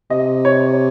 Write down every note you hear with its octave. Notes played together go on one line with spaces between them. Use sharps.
C3 D#5
C#5